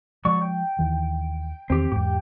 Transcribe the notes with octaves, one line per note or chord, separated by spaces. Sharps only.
F3 F#3 G#3 D5 C#6
G5
D#2 D#3 E3
E2 D#3 C4 G4
E2 G#2 G4 G5